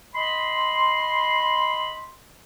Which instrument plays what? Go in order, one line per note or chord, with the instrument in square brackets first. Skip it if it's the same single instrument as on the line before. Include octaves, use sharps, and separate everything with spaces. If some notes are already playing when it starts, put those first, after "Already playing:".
[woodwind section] D#5 B5 C6